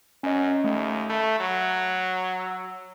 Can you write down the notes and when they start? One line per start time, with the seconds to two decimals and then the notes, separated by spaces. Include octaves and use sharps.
0.23 F#2 C#4 D#5
0.64 D#2 A3
1.09 A3 B5
1.40 F#3
2.39 E6